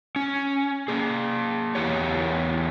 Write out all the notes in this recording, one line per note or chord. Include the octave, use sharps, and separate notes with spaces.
C#4
A#3 G#4
E2 G4 C#5